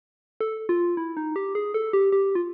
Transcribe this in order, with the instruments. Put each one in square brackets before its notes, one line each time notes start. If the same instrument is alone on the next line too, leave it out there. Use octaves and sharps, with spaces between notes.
[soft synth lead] A4
F4
E4
D#4
G4
G#4
A4
G4
G4
F4